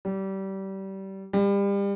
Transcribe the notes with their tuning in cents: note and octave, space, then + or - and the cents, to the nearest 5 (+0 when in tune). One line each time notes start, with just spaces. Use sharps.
G3 -25
G3 +30